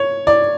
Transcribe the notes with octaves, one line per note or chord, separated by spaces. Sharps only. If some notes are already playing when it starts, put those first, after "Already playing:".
Already playing: C#5
D5